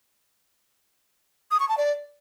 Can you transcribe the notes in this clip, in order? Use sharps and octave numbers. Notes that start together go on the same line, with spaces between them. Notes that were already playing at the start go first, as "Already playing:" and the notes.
D#6
C#6
A5
D5